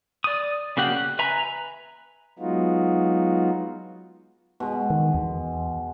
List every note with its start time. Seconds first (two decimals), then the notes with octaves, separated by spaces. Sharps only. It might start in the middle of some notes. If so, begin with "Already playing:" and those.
0.24 D5 D#6
0.77 C#3 A#3 F#4 G4 F#5
0.96 F#6
1.19 B4 E5 G#5 A#5 B5
2.39 F#3 G#3 B3 D#4 F4 F#4
4.60 B2 G#3
4.90 D#3
5.15 E2